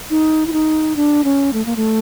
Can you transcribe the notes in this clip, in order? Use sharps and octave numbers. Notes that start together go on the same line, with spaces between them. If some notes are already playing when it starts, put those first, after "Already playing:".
D#4
E4
D#4
D4
C#4
A3
A#3
A3